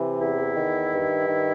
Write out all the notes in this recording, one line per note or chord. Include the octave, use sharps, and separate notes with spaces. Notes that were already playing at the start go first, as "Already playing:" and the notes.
Already playing: C3 E3
E2 E4
D#3
G2
D#3